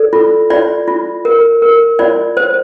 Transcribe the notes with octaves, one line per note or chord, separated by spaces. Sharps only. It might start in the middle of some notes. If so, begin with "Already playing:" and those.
Already playing: A4 D5
F4
F4 D5
F4
A#4
A#4
F4 D5
C5